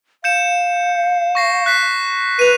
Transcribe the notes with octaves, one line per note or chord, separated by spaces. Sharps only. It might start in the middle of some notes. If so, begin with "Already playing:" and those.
F5 G6 C#7 E7
C#6 A#6 C7
F#6 B6 C7
B4 D#7 F7